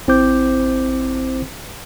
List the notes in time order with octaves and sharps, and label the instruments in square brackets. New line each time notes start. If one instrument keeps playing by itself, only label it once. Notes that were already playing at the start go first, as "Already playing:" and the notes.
[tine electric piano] A1 C4 E4 C5 D6 G6